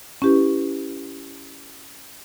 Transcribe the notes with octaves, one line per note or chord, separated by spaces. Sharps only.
C#4 E4 G4 B4